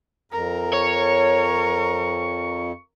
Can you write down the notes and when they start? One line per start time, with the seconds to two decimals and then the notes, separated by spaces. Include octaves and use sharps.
0.32 F2 A#4 A#5
0.73 C#5 C#6